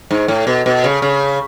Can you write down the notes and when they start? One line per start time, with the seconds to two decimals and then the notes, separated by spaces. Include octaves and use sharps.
0.11 G#2
0.28 A2
0.47 B2
0.66 B2
0.84 C#3
1.02 C#3